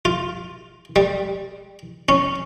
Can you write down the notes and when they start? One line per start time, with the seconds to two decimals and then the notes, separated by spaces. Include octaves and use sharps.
0.05 F4
0.96 G3
2.09 C#4